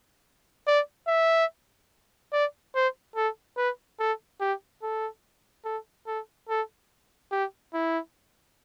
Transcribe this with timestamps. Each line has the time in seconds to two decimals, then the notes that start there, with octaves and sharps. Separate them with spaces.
0.67 D5
1.08 E5
2.32 D5
2.75 C5
3.16 A4
3.57 B4
4.00 A4
4.40 G4
4.82 A4
5.65 A4
6.07 A4
6.49 A4
7.32 G4
7.74 E4